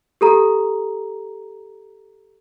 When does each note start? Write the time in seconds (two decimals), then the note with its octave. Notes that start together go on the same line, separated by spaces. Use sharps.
0.21 G4 A4 A#5